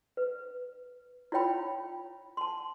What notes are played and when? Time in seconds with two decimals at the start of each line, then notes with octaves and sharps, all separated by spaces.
0.17 B4
1.32 E4 F4 C#5 G5 B5
2.37 A5 C6